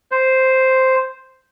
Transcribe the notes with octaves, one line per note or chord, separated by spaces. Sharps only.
C5